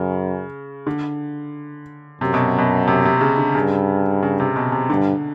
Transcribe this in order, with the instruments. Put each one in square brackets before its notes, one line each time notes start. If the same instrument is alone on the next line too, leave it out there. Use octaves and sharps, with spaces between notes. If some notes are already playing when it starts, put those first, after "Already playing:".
Already playing: [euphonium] F#2 [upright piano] C#3
[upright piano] D3
[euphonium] F#2 [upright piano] C3
[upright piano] B2
B2
C3
C3
C#3
D3
[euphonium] G2 [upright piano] C#3
[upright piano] C#3
C3
B2
C3
[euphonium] G2 [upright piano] D3